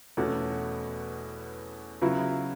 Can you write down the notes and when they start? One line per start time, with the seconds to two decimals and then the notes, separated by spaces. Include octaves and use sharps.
0.17 E2 B2 A3 C#4 F#4
2.01 C#3 F#3 B3 E4